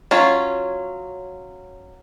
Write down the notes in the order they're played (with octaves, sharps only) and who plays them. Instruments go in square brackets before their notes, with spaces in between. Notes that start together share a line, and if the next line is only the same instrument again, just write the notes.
[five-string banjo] F#3 C#4 F4